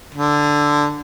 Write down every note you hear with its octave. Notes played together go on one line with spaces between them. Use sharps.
D3